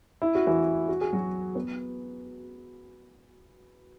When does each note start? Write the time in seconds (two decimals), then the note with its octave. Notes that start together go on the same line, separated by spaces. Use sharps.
0.22 E4
0.35 F#4
0.47 E3 E4
0.89 F#4
1.01 G#4
1.13 F#3 F#4
1.55 B3 B4